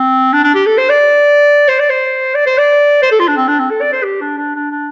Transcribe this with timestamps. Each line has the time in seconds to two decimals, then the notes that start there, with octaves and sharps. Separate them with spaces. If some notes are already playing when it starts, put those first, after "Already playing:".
Already playing: C4
0.33 D4
0.44 D4
0.55 G4
0.66 A4
0.78 C5
0.89 D5
1.68 C5
1.79 D5
1.90 C5
2.35 D5
2.46 C5
2.58 D5
3.03 C5
3.11 A4
3.20 F4
3.28 D4
3.37 C4
3.48 D4
3.59 C4
3.70 A4
3.81 D5
3.93 C5
4.04 G4
4.21 D4
4.38 D4
4.55 D4
4.71 D4